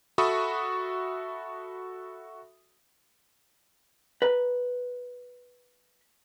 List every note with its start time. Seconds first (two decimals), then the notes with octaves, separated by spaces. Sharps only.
0.18 F#4 A4 E5 B5 C#6 D#6
4.22 B4 A#5